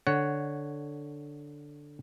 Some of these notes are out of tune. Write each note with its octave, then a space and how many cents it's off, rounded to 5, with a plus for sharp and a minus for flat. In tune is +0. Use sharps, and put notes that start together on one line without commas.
D3 +0 C#5 +0 F#5 +5